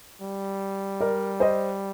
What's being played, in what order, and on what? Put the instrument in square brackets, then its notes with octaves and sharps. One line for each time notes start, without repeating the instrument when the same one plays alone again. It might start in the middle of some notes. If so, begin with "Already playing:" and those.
[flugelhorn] G3
[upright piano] A#4 D5
C5 D#5